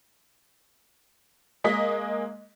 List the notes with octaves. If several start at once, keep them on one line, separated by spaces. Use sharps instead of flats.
G#3 A#3 D#5 B6